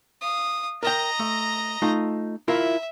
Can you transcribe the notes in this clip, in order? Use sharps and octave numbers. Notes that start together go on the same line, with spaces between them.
F5 D#6
A#4 D#5 G5 A#5
A3
A3 D#4 F4
E4 F4 A#4 E5